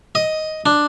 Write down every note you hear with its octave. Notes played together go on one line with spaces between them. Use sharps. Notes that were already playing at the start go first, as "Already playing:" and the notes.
D#5
D4